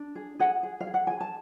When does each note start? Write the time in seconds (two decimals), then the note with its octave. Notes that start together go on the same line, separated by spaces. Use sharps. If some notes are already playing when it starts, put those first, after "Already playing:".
Already playing: D4
0.15 G#4
0.39 G#4 F#5
0.63 G#4
0.81 F5
0.87 G#4
0.94 F#5
1.07 G#4 G#5
1.20 A5